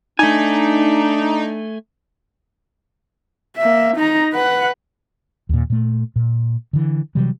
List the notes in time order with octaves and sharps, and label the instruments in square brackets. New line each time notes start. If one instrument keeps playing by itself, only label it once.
[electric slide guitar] A3 G#5 [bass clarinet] D4 [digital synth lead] D#4
[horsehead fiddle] A#3 E5
D#4 A#5
B4 F#5
[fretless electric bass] D#2 A#2
A#2 A3
A#2
D3 E3
C3 E3 F#3 G3